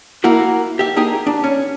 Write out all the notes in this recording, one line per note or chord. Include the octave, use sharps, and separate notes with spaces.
A#3 E4 F#4 A#4
G4 E5
A#3 D#4 G4 G#4
D4
C#4